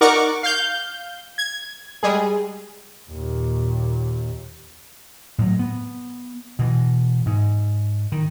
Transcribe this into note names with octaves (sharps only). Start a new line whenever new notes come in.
D#4 A#4 D5 F#5 C#6 D6
F5 G6
G#6
G3 G#3 G#4
D#2 A#2
A2 F#3
B3
B2 E3
G#2
D#3